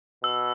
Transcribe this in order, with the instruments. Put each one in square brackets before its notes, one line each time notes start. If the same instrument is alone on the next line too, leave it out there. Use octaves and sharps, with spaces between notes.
[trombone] B2 [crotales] E6